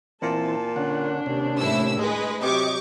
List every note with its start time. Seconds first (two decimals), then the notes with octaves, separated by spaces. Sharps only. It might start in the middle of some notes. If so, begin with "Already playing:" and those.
0.22 A#2 E3 C4 A5
0.76 D3 C#4 D4 F#5
1.26 D#2 C3 C#4
1.59 A2 E4 E6
1.99 G#3 G#4 B4 D#5
2.42 C3 F#3 G4 D#5 C#6 D6